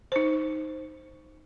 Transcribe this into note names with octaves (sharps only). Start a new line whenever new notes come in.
D#4 C5